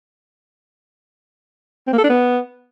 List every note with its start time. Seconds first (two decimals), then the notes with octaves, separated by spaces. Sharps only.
1.87 C4
1.93 A#3
1.98 A4
2.04 D4
2.09 B3